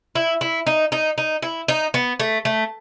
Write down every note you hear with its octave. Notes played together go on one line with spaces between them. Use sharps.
E4
E4
D#4
D#4
D#4
E4
D#4
B3
A3
A3